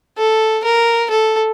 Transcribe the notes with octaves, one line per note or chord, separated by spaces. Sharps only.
A4
A#4
A4